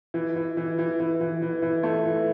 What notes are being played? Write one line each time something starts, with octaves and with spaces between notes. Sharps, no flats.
E3
E3
E3
E3
E3
E3
E3
E3
A3
E3